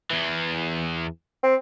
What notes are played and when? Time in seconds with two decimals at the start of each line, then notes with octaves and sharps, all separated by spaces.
0.11 E2 E3
1.43 C4